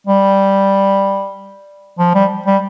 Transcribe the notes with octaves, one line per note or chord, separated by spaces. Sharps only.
G3
F3
G3
G3